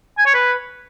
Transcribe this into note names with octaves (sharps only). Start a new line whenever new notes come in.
G#5
C#5
B4